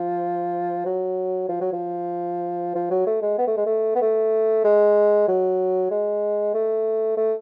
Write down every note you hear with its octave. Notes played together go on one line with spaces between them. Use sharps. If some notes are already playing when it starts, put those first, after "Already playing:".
Already playing: F3
F#3
F3
F#3
F3
F3
F#3
A3
G#3
B3
A3
G#3
A3
B3
A3
G#3
F#3
G#3
A3
A3